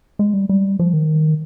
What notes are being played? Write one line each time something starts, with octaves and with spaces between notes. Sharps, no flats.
G#3
G3
G3
F3
D#3